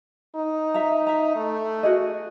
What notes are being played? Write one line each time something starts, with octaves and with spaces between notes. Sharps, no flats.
D#4
E5 A#5
E5 A#5
A3
F#4 G#4 D#5